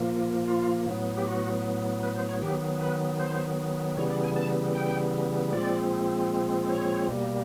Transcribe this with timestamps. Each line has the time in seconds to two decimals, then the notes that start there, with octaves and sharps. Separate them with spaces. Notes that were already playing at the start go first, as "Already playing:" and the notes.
Already playing: A#2 F3 A#3
0.48 F4
0.87 A2 F#3 B3
1.17 G4
1.26 F#4
2.03 B4
2.16 C5
2.29 C#5
2.42 D#3 F#3 B3 G4
2.81 B4
3.20 C5
3.97 C#3 E3 G3 B3 C#5
4.10 D5
4.24 G#5
4.36 A5
4.75 G5
5.53 A#2 F3 G#3 C4 D5
6.69 C#5
7.08 B2 G3 A#3